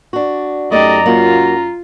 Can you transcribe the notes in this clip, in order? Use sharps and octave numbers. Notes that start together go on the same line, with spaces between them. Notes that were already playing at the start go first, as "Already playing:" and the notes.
D4 F#4
F#2 A3 D#4 G4 D5 D#5 A#5
F#3 A#3 F4 F#5